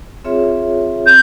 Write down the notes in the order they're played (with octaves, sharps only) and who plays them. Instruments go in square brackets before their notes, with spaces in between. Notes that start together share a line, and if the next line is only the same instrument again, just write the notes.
[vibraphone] C4 F4 G#4 C#5 E5
[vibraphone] C4 [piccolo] G6